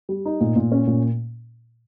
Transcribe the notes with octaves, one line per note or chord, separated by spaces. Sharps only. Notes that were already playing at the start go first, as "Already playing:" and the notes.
G3
D#4
A#2
A#2
C#4
A#2